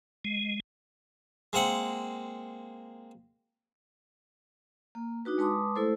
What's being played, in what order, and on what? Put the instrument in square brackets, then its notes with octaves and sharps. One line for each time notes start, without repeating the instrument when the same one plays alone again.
[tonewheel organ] G#3
[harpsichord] G#3 A#3 C4 F#5
[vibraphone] A#3
D4 D#4 F#4 B4
G#3 B4 A5 C6 D6 D#6
A3 E4 A4 C5